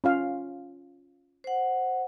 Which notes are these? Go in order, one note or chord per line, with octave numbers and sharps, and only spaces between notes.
C#4 F4 F5
C5 F#5